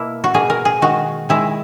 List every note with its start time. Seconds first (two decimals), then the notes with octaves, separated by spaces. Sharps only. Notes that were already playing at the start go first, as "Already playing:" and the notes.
Already playing: B2 A#3 E4
0.24 F#4
0.34 B2 A#3 G#4
0.50 A#4
0.65 G#4
0.82 D#3 G#3 F#4
1.29 D#3 G#3 E4